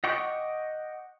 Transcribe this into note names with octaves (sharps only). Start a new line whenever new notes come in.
D#5 F#5 G5 C#6 D6